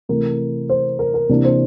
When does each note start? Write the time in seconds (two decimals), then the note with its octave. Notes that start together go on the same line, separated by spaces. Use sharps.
0.09 C3 E3 A3 A#4
0.69 C5
0.99 A#4
1.14 A#4
1.29 C3 E3 A#3 D4
1.44 C5